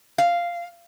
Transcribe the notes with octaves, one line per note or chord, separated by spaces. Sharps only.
F5